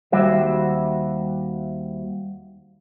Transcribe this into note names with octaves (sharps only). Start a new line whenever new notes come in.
D#2 G3 F#4 C5 E5